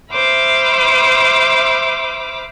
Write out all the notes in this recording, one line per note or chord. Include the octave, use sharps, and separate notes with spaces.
C5 E5 B5 D6 F6